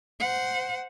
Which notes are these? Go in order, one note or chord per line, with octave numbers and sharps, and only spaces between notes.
C5 F#5